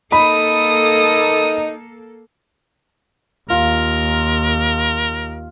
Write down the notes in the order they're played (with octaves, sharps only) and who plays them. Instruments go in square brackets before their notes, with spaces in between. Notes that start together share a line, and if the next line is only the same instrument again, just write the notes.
[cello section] A#3 A4 [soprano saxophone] D#4 [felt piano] B5 [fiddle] D#6
[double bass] D#2 [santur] F4 [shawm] A#4